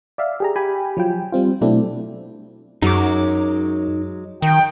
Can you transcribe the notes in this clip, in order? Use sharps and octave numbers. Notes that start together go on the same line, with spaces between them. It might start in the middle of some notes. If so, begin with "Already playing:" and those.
D5 E5 F5
G4 G#4 A#5
G4 G5 G#5 B5
F3 F#3 F4 G5
G3 C4 F4
B2 F#3 A3 C4 D4 E4
F#2 F#3 G#3 D#4 D6
D#3 G5